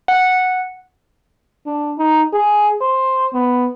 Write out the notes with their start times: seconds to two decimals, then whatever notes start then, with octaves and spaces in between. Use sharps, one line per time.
0.08 F#5
1.66 D4
1.98 D#4
2.33 G#4
2.81 C5
3.34 B3